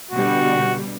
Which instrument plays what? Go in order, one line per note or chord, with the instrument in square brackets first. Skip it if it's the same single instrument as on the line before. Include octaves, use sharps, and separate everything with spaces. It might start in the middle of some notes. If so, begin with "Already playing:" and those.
[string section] B2 D3 G3 [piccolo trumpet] F#4